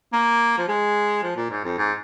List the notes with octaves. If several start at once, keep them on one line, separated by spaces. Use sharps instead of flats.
A#3
F3
G#3
F3
A#2
G#2
F2
G#2